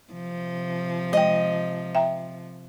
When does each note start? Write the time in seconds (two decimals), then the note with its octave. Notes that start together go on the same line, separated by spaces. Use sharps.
0.13 C3 F3
1.13 G#3 D#5 G5
1.95 E5 G5 A#5